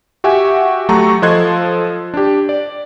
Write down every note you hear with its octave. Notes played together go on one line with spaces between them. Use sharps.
F#4 G4 E5 F#5 G#5
F#3 A3 G4 A4 A#5 C#6
F3 A4 D#5 C6 F#6 G#6
D4 G4
D5